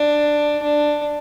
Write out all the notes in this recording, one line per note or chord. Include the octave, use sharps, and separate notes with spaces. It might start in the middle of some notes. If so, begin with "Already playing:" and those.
Already playing: D4
D4